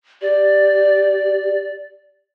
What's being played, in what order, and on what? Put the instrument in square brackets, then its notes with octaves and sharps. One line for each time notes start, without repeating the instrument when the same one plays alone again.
[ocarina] G4 [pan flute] D5